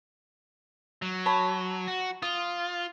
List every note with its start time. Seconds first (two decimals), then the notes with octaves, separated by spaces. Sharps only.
1.02 F#3
1.26 C#5 A5 B5
1.87 F#4
2.22 F4 D#6